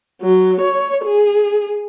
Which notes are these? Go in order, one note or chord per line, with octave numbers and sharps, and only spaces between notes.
F#3
C#5
G#4